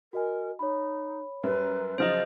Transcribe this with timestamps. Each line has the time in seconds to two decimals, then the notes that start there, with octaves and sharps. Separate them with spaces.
0.13 F#4 A#4 D#5 G#5
0.59 D#4 C#5 B5
1.43 F#2 G3 A#4 B4
1.98 C#3 F3 F#3 G#4 C5 D#5 F6 F#7